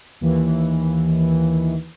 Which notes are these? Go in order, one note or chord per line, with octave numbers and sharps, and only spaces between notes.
D#2 E3